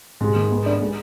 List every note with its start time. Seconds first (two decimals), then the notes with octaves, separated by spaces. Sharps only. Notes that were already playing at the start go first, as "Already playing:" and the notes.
0.21 G#2 C3
0.36 D#3
0.51 B3
0.66 D4
0.81 G#3